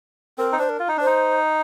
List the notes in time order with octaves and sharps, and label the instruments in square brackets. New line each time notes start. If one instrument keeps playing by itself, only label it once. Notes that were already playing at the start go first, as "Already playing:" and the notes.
[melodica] C4 [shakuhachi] A#4
[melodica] D#4
[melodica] D4 [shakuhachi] C5
[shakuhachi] A#4
[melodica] F4
D#4
[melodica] D4 [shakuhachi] C5
[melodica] D#4